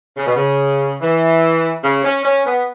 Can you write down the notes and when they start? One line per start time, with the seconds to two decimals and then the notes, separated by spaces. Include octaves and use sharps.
0.17 C#3
0.27 B2
0.36 C#3
1.01 E3
1.84 C#3
2.04 C#4
2.25 C#4
2.46 B3